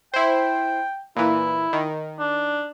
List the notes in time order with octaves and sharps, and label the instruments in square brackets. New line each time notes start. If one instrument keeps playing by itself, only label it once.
[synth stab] E4 C5 [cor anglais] G5
[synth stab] A#2 E3 [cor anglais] E4
[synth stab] D#3
[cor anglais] D4